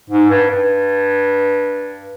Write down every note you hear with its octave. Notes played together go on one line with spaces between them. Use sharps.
G#2
G2
G2